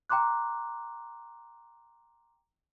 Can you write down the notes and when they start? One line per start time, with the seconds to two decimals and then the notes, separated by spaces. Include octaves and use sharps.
0.10 G5 A#5 C6 D6 F#6